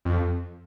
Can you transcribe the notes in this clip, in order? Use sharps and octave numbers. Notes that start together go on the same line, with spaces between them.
F2